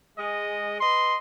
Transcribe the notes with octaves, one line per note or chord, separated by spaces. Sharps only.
G#3 D#5
B4 D#5 C6